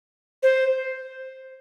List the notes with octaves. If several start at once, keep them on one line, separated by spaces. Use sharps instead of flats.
C5